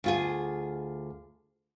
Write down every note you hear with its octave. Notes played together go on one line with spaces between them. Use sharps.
D2 F4 G#4